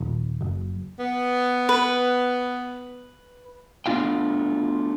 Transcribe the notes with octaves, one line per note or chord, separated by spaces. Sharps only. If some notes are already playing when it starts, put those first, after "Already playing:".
D#1
F#1
B3
B4
A3 B3 D4 F4 F5 G5